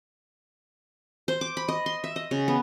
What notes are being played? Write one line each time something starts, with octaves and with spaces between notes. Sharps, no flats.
C5
D6
B5
D#5
C6
E5
D#5
C#3
B3